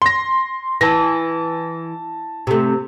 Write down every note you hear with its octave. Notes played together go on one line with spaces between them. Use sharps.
C6 A#6
E3 A5 A#6
C3 A3